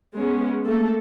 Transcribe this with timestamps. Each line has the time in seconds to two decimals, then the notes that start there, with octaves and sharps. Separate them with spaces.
0.15 G#3 B3 C#4
0.66 A3 A#3 A4